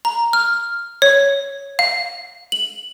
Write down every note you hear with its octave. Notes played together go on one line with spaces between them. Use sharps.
A#5
F6
C#5
F5
F#7